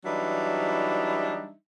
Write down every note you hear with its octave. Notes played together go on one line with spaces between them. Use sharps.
E3 F#3 G3 D4 D#4 E5